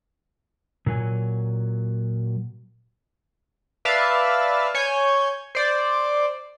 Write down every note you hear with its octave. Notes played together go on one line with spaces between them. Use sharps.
A#2 F#3 G#5
B4 D5 E5 F5 A5
C#5 G#5 G6
C5 D5